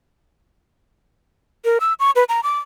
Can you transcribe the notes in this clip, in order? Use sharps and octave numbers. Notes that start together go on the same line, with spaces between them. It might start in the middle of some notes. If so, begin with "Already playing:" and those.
A#4
E6
C#6
B4
A#5
D6